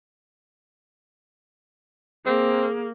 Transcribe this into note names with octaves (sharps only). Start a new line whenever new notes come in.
A#3 C4 G#4